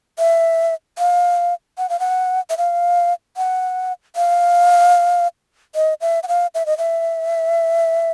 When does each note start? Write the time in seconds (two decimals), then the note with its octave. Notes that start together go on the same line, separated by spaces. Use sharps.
0.19 E5
0.98 F5
1.78 F#5
1.90 F5
2.00 F#5
2.50 E5
2.58 F5
3.37 F#5
4.16 F5
5.75 D#5
6.01 E5
6.23 F#5
6.28 F5
6.55 E5
6.66 D#5
6.78 E5